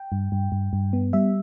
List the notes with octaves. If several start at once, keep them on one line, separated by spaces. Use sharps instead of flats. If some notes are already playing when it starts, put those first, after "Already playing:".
Already playing: G5
G2
G2
G2
G2
B3
G3 E5